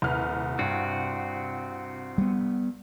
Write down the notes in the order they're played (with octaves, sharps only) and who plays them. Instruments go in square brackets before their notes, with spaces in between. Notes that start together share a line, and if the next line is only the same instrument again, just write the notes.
[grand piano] D#1 B4 [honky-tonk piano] C2 F6
[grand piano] G2 [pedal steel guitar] C4 F#4
[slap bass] G3 B3